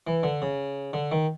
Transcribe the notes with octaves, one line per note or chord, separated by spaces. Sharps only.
E3
D3
C#3
D3
D#3